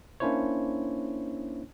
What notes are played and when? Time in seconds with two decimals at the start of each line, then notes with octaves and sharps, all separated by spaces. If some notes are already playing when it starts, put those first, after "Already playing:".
0.20 A#3 C#4 D4 E4 C5 C#5